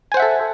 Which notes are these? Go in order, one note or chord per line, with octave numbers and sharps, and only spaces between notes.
A4 C5 E5 F#5 G#5